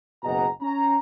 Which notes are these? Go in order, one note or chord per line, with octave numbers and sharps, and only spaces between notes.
F#1 B2 G#4 D#5 F#5 A#5
C#4 A#5